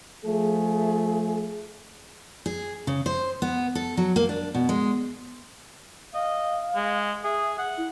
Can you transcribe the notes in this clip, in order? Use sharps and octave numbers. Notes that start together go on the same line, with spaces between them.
F3 A3 G#4
G#4
C#3
C5
B3
A4
F#3
A#3
D4
B2
G#3
D#5 F5
G#3
G#4 E5
F#5
E4